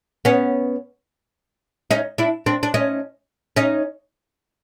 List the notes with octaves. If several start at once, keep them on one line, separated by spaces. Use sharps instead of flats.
B3 C#4
C#4 D#4
D4 E4
C4 D4
D4
C#4 D#4
C#4 D#4